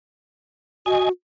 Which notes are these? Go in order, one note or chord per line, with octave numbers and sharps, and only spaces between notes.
F#4 D#5 G#5